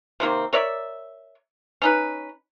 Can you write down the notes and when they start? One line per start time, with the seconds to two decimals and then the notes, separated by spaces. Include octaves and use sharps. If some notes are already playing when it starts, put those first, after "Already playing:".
0.20 C3 D#3 A#3 C4
0.53 A#4 C#5 D5 E5
1.82 C#4 D#4 B4